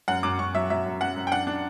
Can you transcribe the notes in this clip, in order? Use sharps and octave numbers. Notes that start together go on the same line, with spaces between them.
F#2 F#5
F#2 D6
F#2 C#6
F#3 E5
F#3 E5
F#2
F#2 F#5
F#2
G5
D4 F#5
D4